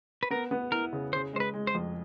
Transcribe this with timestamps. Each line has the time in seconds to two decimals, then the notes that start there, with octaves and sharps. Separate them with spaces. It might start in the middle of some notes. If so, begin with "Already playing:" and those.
0.23 B4
0.31 B3 A#4
0.51 B3
0.72 E4 A#4
0.93 C#3
1.13 C#3 C5
1.33 G#3 C5
1.40 B4
1.54 G#3
1.67 C5
1.75 F2